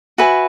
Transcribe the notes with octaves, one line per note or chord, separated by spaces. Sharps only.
F#4 B4 E5 G#5